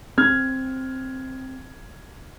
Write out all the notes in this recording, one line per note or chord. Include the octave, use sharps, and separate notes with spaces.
C4 F6 G#6